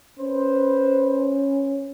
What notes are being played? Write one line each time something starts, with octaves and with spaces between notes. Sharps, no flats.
C#4 B4 C5